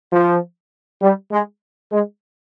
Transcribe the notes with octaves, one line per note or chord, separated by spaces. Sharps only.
F3
G3
G#3
G#3